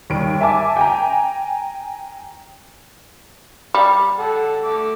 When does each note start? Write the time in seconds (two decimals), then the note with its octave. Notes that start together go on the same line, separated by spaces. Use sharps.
0.10 D#2 G3 D7
0.41 E5 G#5 A5 D6
0.77 G5 G#5 A#5
3.74 G3
4.19 A4 F#5
4.64 A3 D6